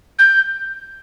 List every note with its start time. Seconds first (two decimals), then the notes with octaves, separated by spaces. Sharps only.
0.19 G6